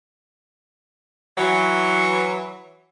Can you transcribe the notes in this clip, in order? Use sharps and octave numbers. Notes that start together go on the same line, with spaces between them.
E3 F#3